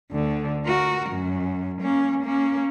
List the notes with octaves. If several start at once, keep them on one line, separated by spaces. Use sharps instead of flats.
D2 D3
F#4 A#4
F#2
A#3 C#4
A#3 C#4